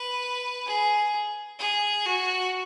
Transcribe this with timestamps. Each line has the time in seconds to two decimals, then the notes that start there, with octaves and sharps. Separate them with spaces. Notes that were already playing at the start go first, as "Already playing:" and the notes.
Already playing: B4
0.66 G#4
1.59 G#4
2.06 F#4